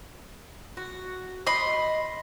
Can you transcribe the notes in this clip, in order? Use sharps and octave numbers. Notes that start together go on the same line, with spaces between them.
F#4
D#5 B5 C6